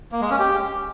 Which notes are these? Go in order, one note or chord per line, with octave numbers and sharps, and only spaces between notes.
A#3
G#3
C#4
G4